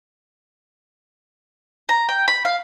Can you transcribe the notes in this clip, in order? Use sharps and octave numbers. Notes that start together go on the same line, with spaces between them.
A#5
G5
B5
F5